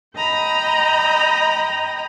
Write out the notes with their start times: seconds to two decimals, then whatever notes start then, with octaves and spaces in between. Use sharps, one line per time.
0.16 D#5 G5 A#5 B5